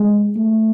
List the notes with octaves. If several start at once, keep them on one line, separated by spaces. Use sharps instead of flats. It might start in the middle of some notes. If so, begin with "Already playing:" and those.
Already playing: G#3
A3